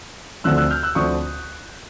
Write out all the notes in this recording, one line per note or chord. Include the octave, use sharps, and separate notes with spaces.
D2 D3 F3 A3 C4 E6 F#6
E6 F#6
F6 G6
E6 F#6
D2 D3 F3 A3 C4 C#6 D#6